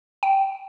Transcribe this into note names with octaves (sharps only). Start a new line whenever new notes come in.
G5